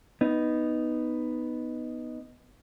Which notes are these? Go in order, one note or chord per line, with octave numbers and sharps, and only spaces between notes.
B3 D#4